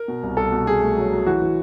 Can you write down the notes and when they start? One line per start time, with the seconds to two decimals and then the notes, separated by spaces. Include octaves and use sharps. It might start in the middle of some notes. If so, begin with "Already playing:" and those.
Already playing: A#4
0.08 B2
0.23 C2
0.37 C2 A4
0.52 B2
0.67 B2 G#4
0.82 A3
0.96 F#3
1.12 F#3
1.26 E3 F#4
1.42 E3